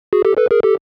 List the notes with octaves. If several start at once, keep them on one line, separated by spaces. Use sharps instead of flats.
F#4 G#4
G4 A4
A4 B4
G#4 A#4
G4 A4